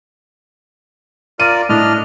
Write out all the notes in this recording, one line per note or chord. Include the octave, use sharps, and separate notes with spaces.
F4 A#4 D5 D#7
A2 D4 D#5 F6